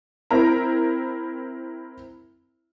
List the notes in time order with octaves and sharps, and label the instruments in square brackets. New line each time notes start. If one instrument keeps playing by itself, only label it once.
[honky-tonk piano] C4 E4 A#4 A#5